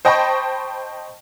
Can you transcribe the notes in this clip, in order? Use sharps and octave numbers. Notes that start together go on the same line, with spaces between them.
C5 D#5 G5 A5 B5 C#6